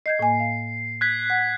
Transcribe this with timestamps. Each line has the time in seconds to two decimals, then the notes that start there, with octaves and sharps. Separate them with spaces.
0.06 D#5 G6 G#6 C7
0.19 A2 A#3 G#5
0.40 F5
1.01 F#6 G#6 B6
1.30 F#5